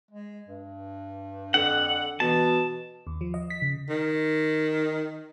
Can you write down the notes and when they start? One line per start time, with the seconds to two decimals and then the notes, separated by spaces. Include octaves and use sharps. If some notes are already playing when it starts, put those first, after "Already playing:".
0.11 G#3
0.48 G2
1.54 F2 D3 F#5
2.20 B2 E3 A5
3.07 D#2
3.21 F3
3.34 D#5
3.50 B6
3.62 C#3
3.89 D#3